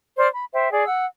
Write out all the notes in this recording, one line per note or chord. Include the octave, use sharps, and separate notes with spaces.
C5 D5 F6
B5
C5 E5 G5
G#4 D5
F#5 E6